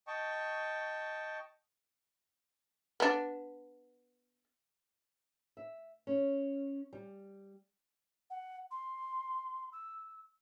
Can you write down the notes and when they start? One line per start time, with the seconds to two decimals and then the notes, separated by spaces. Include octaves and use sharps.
0.07 D#5 G5 A5 C#6
3.00 B3 D4
5.57 E5
6.07 C#4
6.93 G3
8.30 F#5
8.71 C6
9.72 E6